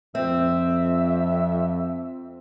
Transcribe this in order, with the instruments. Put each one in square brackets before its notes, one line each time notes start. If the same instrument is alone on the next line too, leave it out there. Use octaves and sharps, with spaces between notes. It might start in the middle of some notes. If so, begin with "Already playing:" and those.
[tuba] F2 [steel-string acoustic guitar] C4 [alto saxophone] E5